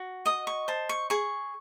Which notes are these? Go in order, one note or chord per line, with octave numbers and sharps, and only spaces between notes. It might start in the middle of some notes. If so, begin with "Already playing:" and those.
Already playing: F#4
D#5 D#6
C#6
C5 A5
C#6
G#4 C#6